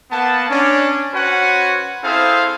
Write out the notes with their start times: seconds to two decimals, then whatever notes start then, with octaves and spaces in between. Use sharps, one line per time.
0.11 A#3 B3 B4 F#5 A5
0.49 C#4 D4
1.13 C#4 F#4 B4 C5 F#5 G#5
2.03 C4 E4 G#4 A4 C5 F5